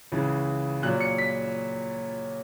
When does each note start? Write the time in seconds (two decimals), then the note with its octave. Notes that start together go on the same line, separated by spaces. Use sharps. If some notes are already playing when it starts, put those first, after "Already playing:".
0.12 C#2 C#3 E3
0.82 A#2 F#3 F#6
1.01 C#7
1.18 B6